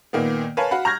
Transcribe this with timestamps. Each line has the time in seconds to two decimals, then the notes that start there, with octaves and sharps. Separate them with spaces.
0.13 A#2 D#3 A#3 B3
0.57 A#4 B4 C#5 F5 G#5 A5
0.71 F#4 F5 F#5 B5
0.85 A#5 C#6 F6 G6 G#6 A#6